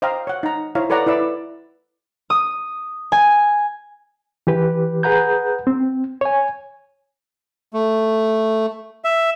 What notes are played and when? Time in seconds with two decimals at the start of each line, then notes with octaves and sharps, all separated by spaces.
0.02 C5 D#5 F5 G5 A#5
0.27 C#5 F#5
0.43 D#4 A#5
0.75 E4 C5 C#5 F5 A#5
0.90 A4 B4 C#5 D5 F#5 A#5
1.07 E4 B4 D5 E6
2.30 D#6
3.12 G#5
4.47 E3 G4 B4
5.03 G#4 B4 F#5 A#5 G6
5.67 C4
6.21 C#5 G#5
7.73 A3
9.04 E5